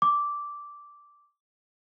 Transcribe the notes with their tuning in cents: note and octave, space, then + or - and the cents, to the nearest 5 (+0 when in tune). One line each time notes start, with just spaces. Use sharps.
D6 -10